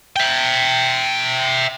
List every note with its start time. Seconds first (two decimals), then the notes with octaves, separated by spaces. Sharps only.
0.16 E5 G5